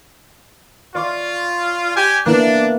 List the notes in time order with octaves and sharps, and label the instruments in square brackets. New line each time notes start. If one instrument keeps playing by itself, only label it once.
[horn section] F4 [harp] D5 C#6 D6
[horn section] G4 G#5
[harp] A#3 B3 E4 [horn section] D4